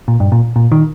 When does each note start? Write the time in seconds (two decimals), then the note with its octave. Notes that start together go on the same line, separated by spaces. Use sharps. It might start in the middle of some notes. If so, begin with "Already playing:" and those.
0.08 A#2
0.20 G2
0.32 A#2
0.56 A#2
0.72 D#3